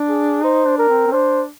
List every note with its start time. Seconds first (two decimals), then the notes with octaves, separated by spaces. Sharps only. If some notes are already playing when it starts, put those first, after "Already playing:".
Already playing: D4
0.09 G#4
0.43 D#4 C5
0.66 D4
0.78 A#4
0.89 C4
1.07 C4
1.12 D4 C5